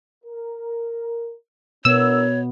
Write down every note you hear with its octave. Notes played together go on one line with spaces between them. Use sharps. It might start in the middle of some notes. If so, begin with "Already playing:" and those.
A#4
B2 B3 D4 E4 A#4 C#5 E6